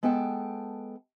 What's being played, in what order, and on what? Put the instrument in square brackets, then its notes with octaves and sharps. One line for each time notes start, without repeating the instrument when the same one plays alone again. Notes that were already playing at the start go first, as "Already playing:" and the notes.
[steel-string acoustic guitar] G#3 B3 A4 G5 A5